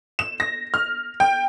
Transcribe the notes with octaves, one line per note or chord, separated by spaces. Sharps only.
E7
A#6
F6
G5